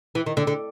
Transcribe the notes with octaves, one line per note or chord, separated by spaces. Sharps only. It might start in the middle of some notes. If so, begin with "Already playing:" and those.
E3
D#3
D3
D3